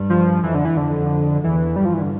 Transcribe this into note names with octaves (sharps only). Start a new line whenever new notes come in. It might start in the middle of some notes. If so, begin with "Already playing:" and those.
Already playing: G2
F3
F2 E3
D3
E3
F2 D3
E2 E3
G2 G3
F3
E3
D3